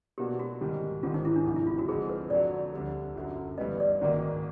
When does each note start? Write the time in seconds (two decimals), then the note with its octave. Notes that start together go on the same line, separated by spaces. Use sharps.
0.18 B2 F#3 A#3 D4 F#4 G4
0.39 F#4
0.61 G#2 D#3 G3
1.03 G#1 G#2 D#3 G3 C4 F4
1.14 D#4
1.25 E4
1.36 D4
1.45 G1 F2 C3 D#4
1.56 E4
1.67 F4
1.78 F#4
1.88 F2 D3 F3 G#3 C4 G#4
2.09 B4
2.30 F2 D3 F#3 D5
2.73 D2 D3 G3
3.16 G1 F#2 D3 F#3
3.58 G2 E3 G3 B3 D#5
3.80 D5
4.00 G#1 G#2 D#3 F#3 A#3 D5